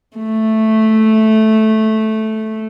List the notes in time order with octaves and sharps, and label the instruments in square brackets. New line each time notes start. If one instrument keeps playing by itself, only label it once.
[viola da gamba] A3